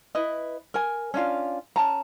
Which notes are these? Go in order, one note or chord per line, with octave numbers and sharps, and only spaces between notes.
E4 B4 D#5
A#4 G#5
C#4 D4 F4 F5
C#4 A5 A#5